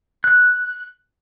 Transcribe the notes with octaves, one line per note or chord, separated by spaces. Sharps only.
F#6